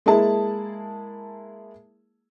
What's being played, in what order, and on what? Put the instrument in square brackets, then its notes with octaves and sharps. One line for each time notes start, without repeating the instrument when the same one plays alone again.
[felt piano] G#3 A#3 E4 G#4 A5